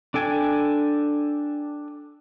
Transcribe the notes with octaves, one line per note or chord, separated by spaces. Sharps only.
D4 A4 G5 G#5